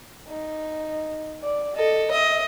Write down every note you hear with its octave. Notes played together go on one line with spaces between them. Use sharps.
D#4
D5
A4 D#5
D#5 E5